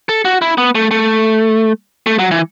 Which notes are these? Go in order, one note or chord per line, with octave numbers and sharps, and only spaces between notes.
A4
F#4
E4
B3
A3
A3
A3
F#3
E3